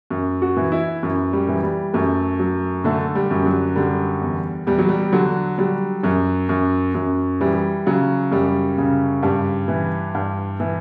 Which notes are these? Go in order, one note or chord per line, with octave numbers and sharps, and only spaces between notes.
F#2
F#4
E3
E4
F#2
G3
E3
G3
F#2 A3
F#3
D3 A3
G3
F#2
F#3
D3 G3
E2
E2 G3
F#3
G3
D3 F#3
F#3 G3
F#2 F#3
F#2
F#2
E3 G3
C#3 F#3
F#2 G3
C#3
G2 G3
E3
G2
E3